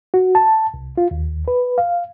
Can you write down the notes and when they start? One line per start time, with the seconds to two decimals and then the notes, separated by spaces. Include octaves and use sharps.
0.14 F#4
0.35 A5
0.74 C2
0.98 F4
1.11 D#2
1.48 B4
1.78 F5